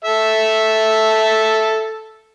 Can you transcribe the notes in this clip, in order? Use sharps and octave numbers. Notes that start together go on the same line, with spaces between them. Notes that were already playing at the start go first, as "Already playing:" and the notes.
A4 E5